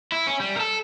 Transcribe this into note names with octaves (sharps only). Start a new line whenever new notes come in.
E4
C#4
G3
A4 A#4